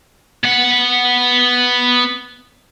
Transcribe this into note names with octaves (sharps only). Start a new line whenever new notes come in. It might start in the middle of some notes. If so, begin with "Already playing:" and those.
B3 F#5